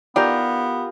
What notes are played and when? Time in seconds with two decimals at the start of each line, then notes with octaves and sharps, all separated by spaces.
0.16 B3 D#4 F4 G4 A#4 D5 G5